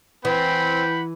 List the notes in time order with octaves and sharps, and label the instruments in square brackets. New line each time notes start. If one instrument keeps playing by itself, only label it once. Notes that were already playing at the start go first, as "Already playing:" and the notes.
[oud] E3 [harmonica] C4 [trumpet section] F#5 B5 [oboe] G5